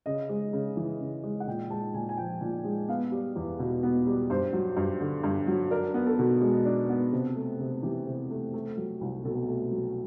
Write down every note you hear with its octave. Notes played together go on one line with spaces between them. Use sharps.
C#3 D#5
G#3
C#3
E3
C#3
G#3
F#5
A#2 G5
G#3 A5
A#2 G#5
G#5
F3 G5
A#2
G#3
B3 F5
G3
E2
B2
B3
G3
G2 C5
F#3
G2
D3
G2
F#3
D4 A#4
B3
A4
B2
G#3
D4
B3
C3
A3
C3
E3 G4
C3
A3
A3
F#3
C2
B2 A4
A3
F#3